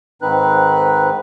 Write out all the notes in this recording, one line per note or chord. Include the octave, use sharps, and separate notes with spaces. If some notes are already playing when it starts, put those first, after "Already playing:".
G#2 D#3 C4 D#4 B4 F#6